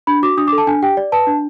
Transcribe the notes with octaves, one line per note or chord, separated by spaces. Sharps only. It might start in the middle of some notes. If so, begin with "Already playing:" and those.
D4 B5
F#4 D6
D4 D#6
D6
A4
A5
D4 G#5
G4 G5
D5
B4 A5
D4